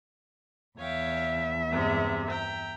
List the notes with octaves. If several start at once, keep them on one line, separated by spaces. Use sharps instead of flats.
E2 C#5 E5 F5 G5
G2 C3 G#3
G5 A#5